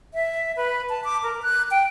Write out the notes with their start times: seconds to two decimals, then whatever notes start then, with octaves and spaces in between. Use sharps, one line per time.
0.14 E5
0.57 B4
0.89 A5
1.04 D6
1.23 A#4
1.42 F#6
1.71 G5